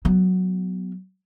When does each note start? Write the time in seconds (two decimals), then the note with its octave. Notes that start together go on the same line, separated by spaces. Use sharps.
0.05 F#3 B3